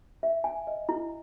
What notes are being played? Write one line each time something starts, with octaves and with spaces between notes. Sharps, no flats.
E5
G#5
D#5
E4